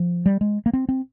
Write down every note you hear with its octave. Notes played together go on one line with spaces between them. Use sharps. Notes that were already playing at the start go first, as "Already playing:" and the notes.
Already playing: F3
G3
G#3
A#3
C4
C4